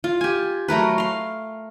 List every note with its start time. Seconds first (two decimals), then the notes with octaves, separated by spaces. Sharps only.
0.04 F4
0.21 G4 G#5
0.68 F#3 A3 A#4 B4
0.98 F5 C6